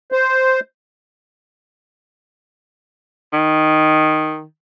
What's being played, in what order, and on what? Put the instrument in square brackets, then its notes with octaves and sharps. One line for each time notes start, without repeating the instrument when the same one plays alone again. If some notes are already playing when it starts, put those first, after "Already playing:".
[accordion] C5
[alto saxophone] D#3